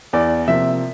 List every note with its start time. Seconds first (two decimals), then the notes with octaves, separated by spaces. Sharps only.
0.13 E2 D5
0.47 C3 F3 A#3 E5